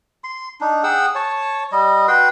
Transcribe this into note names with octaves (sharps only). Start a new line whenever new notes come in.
C6
D4 D#4
G#4 F#5 G5 E6
C#5 A5
G3 D#5
F#4 B4 G5 C6